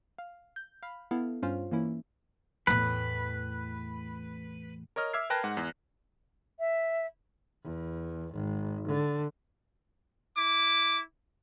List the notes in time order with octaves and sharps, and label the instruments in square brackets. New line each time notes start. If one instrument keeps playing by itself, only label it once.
[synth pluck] F5
G6
F5 B5
B3 E4 A4 F5
G2 C#4 F4 C5 F5
E3 A#3 C#4 E4
[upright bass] E2 A2 [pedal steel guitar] B4
[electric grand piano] A#4 C#5 D#5 F6
E5 D6 E6 F6 G#6 C7
A#4 B4 G5 A5 F#6 A#6
G#2 F#5
E2
[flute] E5
[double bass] E2
G#1
D3
[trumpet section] E4 D6